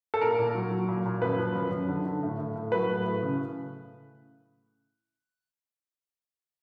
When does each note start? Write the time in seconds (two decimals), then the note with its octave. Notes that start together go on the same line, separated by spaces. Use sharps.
0.14 A4
0.21 A#2 A#4
0.39 A#2
0.55 F#3
0.71 F#3
0.88 A#2
1.06 A#2
1.22 F#2 B4
1.39 F3
1.55 F#2
1.72 F#2
1.88 D3
2.05 D3
2.23 A2
2.39 A2
2.55 A2
2.72 F#3 B4
2.89 A2
3.05 A2
3.23 C#3